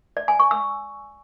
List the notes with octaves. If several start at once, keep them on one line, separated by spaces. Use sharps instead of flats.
D5
G#5
C#6
E6